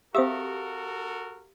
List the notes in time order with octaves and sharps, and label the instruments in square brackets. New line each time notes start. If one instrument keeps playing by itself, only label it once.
[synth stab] C4 E5 [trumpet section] F#4 A4 A#4 [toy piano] G4 F5 D#6